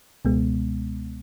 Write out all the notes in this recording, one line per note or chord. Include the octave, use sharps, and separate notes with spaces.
C#2 B2 G#3 B3